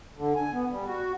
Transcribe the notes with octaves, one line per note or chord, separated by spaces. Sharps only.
D3
G#5
B3
G3
F#4